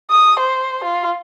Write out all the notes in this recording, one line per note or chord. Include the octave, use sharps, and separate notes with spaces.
D#6
C5
F4